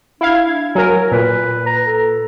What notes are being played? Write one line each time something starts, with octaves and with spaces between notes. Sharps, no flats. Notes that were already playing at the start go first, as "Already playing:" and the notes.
D4 E4 F5 G#6
F#3 A#4 G#5
A#2 B4
A#5
A4